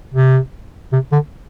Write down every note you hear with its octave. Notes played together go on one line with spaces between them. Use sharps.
C3
C3
D3